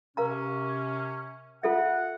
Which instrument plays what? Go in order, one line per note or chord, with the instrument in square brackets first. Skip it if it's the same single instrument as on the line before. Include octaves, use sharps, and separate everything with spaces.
[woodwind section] C3 C#4 [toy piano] A#4 F5 A#5
[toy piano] F4 A4 E5 [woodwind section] F#5